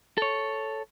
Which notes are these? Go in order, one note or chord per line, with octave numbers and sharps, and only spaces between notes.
A4 C#5